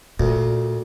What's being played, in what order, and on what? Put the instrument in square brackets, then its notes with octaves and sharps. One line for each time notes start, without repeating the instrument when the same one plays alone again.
[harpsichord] D2 [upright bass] A#2